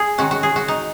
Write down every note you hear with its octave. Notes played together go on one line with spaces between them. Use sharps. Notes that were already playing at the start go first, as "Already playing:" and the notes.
Already playing: G#4
D#3 G#3 C#4 F#4
F#4
G#4
F#4
D#4